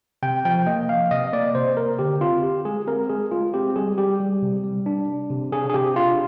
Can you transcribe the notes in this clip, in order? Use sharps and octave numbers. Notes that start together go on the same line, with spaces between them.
C3 G5
F3 G5
A#3 D#5
F3 F5
C3 D#5
A#3 D5
C3 C5
A#3 A#4
D3 G4
C4 F4
D3 G4
G#3 G#4
C4 A#4
G#3 G#4
G#3 F4
C4 G4
G3 G#4
G3 G4
G3
C3
G3
D4
D4
C3
D4 G#4
G#4
C3 G4
D4 F4